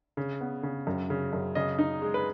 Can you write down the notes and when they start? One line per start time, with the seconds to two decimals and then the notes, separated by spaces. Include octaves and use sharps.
0.17 C#3
0.41 B3
0.63 C#3
0.87 F#2
1.10 C#3
1.33 F#2
1.55 C#3 D#5
1.79 D#4
2.02 G#3
2.14 B4